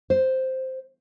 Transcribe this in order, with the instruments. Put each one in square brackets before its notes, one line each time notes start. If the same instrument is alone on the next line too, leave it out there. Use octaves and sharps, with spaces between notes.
[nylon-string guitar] C5